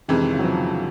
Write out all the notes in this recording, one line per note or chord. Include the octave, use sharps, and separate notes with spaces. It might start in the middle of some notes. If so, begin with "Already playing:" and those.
F2 C3 D#3 E3 G#3
D#3
C#3
F#3
F3